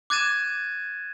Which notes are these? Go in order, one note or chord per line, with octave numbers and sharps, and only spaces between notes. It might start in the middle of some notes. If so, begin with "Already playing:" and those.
D6 F#6 G#6 A6 D#7 E7